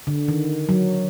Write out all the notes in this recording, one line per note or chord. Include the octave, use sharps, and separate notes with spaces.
D3
D#3
F#3